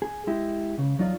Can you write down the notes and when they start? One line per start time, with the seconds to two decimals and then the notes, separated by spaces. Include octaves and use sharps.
0.02 G#4
0.27 G#3 E4 G4
0.78 C#2 C#3
0.99 E2 F#3 D#4 F4 D5